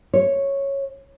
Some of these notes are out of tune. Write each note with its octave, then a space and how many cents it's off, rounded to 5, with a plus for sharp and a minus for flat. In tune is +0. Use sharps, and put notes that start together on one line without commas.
C#5 -5